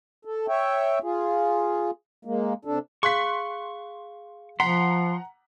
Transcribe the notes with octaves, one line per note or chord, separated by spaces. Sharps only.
A4
C#5 E5 G5
F4 G#4
G#3 A#3
C3 D4 A4
G#4 F5 C6 C#6 F#6 B6
F3 F#5 A#5 C6 B6